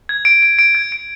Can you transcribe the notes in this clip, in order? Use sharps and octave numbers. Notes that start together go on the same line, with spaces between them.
G#6
D7
D7
D7
G#6
D7